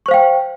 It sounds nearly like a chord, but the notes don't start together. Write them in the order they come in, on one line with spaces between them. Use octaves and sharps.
C#6 C5 F5 G5